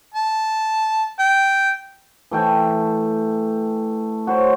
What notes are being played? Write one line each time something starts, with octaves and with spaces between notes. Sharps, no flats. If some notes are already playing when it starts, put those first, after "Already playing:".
A5
G5
E3 A3 G5 A5
F#4 C5 C#5